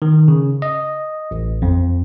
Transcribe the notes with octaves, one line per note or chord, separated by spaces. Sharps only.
D#3
C#3
D#5
A1
F2